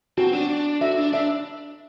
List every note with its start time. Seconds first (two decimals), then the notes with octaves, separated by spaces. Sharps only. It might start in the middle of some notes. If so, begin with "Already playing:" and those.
0.18 C4 F#4
0.33 D4
0.49 D4
0.81 F#4 E5
0.97 D4
1.13 D4 E5